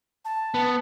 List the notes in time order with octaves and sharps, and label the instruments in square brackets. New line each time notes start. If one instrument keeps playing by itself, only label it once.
[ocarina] A5
[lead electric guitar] B3